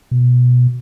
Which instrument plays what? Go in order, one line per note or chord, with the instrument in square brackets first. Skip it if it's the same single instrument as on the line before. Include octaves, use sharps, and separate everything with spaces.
[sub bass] B2